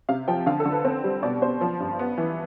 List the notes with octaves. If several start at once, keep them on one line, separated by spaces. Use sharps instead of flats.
C3 F5
F3 G5
D3 F5
A4
D3
B4
C4
G3
B2 D5
B2 C5
F3
G2
B3
E3